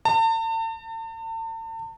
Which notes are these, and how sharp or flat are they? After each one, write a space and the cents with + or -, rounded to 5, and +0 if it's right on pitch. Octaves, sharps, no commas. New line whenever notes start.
A5 +40